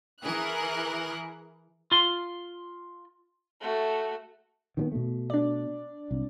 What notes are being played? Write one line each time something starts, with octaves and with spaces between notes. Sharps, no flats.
E3 G#4 A#4 F#6
F4 C6
A3 F#4
D#3 F3 B3
B2 A3
D4 D5
C2